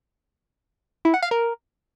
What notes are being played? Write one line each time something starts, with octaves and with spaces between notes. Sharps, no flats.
E4
F#5
F5
A#4